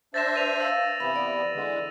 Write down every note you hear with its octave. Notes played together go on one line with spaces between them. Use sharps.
D4 C5 E5 A6 A#6 E7
B4 D#7 F7
F5 E6
C3 E3 B3 B4 E5 B5
D5
D3 E3 G#3